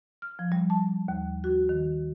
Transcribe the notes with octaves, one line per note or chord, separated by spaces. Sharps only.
F6
F3
G3
A5
D#2
F#4
D#3